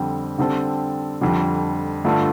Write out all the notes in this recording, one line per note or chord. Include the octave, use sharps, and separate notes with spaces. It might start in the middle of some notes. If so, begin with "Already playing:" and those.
Already playing: F2 D3 G3 C4
D3 G3 C4 A4
F2 D3 G3
G2 D3 A3 F4